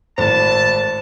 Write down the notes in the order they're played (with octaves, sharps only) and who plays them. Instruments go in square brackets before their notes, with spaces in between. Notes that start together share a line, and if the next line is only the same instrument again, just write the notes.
[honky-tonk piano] G#1 A2 [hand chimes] C5 [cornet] A5